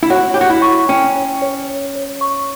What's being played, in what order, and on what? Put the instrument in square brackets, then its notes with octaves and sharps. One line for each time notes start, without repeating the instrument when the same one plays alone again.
[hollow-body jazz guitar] E4
[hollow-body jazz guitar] F#4 [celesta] C#5
[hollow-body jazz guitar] G4 [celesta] C#5
[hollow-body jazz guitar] F#4
E4
[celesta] C#6
[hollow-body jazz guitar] C#4 [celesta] G5
[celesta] C#5
C#5
C#5
C#5
C#6